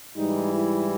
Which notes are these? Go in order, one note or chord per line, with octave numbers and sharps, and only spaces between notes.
G#2 E3 G3 D#4
E4